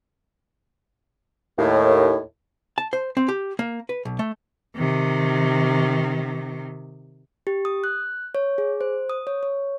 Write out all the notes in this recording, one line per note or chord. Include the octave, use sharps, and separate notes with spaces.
D#2 A2
A5
C5
C4
G4
A#3
B4
B1
A3
C3 D#3
G4
D#6
F#6
C#5
G#4
C5
D#6
C#5
C#5